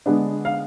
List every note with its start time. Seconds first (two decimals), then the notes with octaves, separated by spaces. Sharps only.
0.06 D3 G#3 B3 D4
0.45 F5